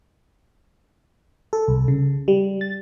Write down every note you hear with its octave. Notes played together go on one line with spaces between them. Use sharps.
A4
C2
C#3
G3
A6